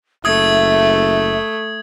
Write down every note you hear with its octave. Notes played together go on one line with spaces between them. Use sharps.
F#1 A3 E5 D#6 G#6